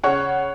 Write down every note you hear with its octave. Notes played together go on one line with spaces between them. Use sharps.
C#3 C#5 F#5